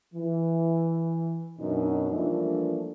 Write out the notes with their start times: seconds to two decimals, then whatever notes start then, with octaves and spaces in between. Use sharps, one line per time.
0.14 E3
1.57 F#2 B2 D4 D#4
2.11 E3 F3 G3 A3 A#3 D4